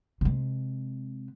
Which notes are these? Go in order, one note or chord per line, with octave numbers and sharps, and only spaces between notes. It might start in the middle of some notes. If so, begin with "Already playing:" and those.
C3 G#3